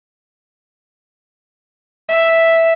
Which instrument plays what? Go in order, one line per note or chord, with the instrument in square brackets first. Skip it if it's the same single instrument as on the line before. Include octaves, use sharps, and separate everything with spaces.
[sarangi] E5